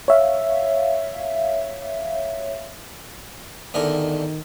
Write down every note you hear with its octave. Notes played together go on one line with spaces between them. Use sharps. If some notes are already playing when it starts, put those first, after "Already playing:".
C#5 E5 F5
E2 D3 D#3 A#4